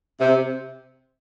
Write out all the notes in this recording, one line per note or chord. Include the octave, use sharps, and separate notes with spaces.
C3